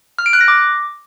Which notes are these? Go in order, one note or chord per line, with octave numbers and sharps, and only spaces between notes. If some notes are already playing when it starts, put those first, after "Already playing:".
F6
D7
F#6
A#6
D6